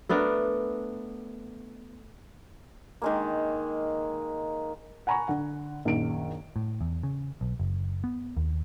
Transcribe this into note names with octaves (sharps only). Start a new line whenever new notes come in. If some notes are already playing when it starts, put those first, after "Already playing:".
A3 B3 D4 A#4
D#3 G#3 A#3
F#5 G#5 A#5 B5 C#6
D3 F#5
A#1 F#2 D#3 D7
A2
E2
C#3
B1
F#1
B3
D#2